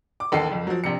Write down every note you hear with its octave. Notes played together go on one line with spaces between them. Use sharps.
D6
A1 D#2 A4 C7
F#1 F2
F3 F#3
A#1 C3 C#7